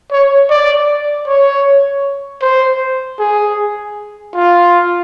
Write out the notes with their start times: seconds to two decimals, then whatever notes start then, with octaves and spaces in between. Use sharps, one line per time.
0.11 C#5
0.50 D5
1.27 C#5
2.42 C5
3.19 G#4
4.35 F4